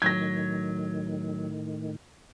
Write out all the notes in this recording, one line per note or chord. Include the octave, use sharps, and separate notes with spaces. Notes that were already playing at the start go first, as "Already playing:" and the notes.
A2 D#3 F#3 G#6 A#6